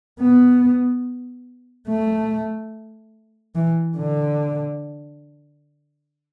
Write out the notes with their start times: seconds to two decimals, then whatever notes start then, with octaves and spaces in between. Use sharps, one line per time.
0.20 B3
1.88 A3
3.56 E3
3.97 D3